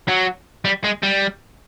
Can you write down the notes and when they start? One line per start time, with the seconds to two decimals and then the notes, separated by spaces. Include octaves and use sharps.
0.08 F#3
0.65 G3
0.84 G#3
1.03 G3